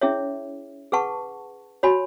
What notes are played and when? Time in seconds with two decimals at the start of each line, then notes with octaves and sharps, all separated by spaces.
0.01 C#4 E4 G#4 C#5 E5
0.92 G#4 B4 F#5 A5 C#6
1.83 F#4 C#5 G#5 B5